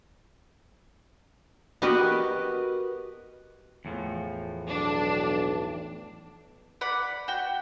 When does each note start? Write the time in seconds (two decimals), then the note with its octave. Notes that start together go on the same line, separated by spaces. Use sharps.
1.82 B3 F#4 G4 A#4 B4 D#5
3.85 E2 A2 F3
4.68 B1 D4
6.81 D5 F#5 B5
7.28 F#4 G5